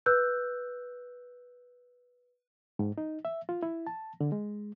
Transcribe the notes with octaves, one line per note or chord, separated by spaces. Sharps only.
B4 E6 F#6 G6
G#2
D#4
E5
F4
E4
A5
D3
G#3